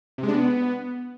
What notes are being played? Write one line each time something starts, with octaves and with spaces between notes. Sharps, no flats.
C3
G#3
D4
B3